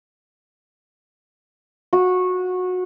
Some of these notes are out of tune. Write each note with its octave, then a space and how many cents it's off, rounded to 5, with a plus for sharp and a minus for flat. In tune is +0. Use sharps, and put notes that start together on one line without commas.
F#4 -20